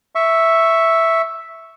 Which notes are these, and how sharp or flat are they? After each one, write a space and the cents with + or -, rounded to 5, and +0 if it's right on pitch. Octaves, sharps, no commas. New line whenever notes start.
E5 +0 C#6 +0